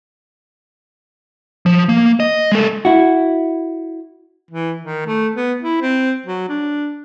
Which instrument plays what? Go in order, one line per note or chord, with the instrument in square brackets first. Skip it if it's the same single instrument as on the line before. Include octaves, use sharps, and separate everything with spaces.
[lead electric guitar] F3
A#3
D#5
G#3 A4
[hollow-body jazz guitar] E4 F#4
[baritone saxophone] E3
D#3
A3
B3
E4
C4
F#3
D4